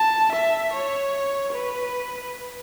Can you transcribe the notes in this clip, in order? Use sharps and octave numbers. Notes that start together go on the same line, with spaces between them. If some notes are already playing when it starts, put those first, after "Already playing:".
Already playing: A5
E5
C#5
B4